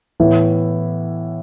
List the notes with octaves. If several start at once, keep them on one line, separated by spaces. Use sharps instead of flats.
A2 E3 B3 E4